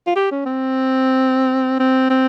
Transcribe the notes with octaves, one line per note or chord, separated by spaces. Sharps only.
F4
G4
C#4
C4
C4
C4